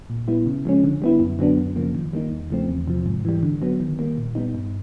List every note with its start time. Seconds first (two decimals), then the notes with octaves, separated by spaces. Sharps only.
0.10 A#2
0.28 G3 B3 E4
0.46 C#3
0.65 F3 G#3 C#4
0.84 D3
1.02 G3 B3 E4
1.20 F#2
1.39 D3 F#3 B3 D4
1.57 F#2
1.76 C#3 F3 A#3
1.95 D#3
2.13 G3 A#3 D#4
2.32 E2
2.50 C#3 F3 A3 C4
2.69 E2
2.88 C3 F3
3.06 G#2
3.25 E3 G3
3.43 D3
3.62 F#3 B3
3.80 D#3
3.99 G3 A#3
4.17 A#2
4.35 G3 B3 D#4
4.55 G2